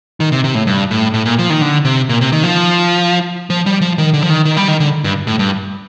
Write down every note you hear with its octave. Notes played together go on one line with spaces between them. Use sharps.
D#3
C3
C3
A2
G2
A2
A2
A#2
F3
D#3
D3
C3
A#2
C3
D#3
F3
F3
G3
F3
D#3
D3
F3
D#3
D#3
G3
D#3
D3
G2
A2
G2